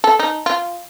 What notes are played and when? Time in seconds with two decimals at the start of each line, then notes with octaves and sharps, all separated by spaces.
0.04 A4
0.19 D#4
0.46 F4